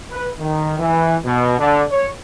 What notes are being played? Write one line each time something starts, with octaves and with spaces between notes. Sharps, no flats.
B4
D#3
E3
B2
D3
C#5